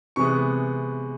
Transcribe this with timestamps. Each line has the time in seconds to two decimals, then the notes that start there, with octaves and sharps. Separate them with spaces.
0.16 C3 E3 G#3 B3 C#6